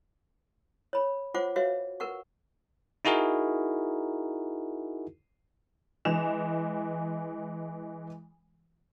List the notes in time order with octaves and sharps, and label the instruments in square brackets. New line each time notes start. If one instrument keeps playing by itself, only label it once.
[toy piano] C#5 B5
F4 C5 C#5 F#5 D6
F#4 B4 C#5 E5 F5
A#4 B4 F#5 C#6
[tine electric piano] D#4 E4 F#4 G#4 A#4
[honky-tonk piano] E3 G#3 E7 F7